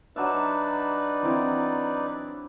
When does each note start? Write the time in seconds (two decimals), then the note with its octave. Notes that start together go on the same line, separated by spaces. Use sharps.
0.16 F#3 D4 D#4 B4 D5 E5
1.23 E3 C4 E4